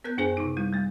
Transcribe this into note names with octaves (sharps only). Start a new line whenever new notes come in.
B3 A#4 F#6 G6
F#2 D4 G#4 C5 G#5
C3 D#4
G3 E4
G3 A3